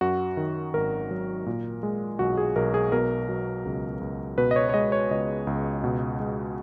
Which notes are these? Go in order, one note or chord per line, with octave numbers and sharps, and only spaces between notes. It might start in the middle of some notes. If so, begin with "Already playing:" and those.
F#2 F#4
D#3
G#1 A#4
F#3
A#2
G#3
B1 F#4
G#4
B1 A#4
G#4
B2 A#4
F#3
C#2
C#2
B2 B4
D#5
C#5
C#5
G#3 D#5
C#5
C#2 D#5
C#2
B2
G#3